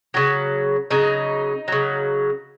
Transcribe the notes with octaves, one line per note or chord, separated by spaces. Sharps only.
C#3 F#3
C#3 F#3 D#4
C#3 F#3